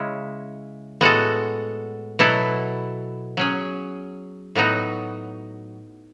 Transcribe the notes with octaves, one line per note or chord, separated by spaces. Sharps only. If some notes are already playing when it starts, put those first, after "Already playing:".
Already playing: C#3 G#3 C#4 E4
A2 G#3 B3 F#4 A4
B2 F#3 B3 E4 A4
F#3 C#4 G#4
A2 F#3 B3 D#4 F#4